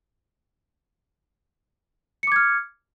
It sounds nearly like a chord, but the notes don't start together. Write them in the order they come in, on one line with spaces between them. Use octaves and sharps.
C#7 D6 G#6 F6